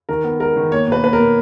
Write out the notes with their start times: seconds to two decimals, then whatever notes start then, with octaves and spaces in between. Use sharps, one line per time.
0.09 D#3 A#4
0.24 B3
0.40 G#3 A#4
0.56 D#3
0.72 A#3 C#5
0.88 B2 B4
1.02 A#3 B4
1.13 A#4
1.19 B2